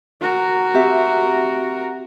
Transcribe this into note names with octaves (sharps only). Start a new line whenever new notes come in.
F#4 A#4
C4 G4 E5